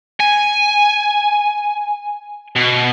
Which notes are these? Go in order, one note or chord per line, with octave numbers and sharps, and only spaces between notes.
G#5
B2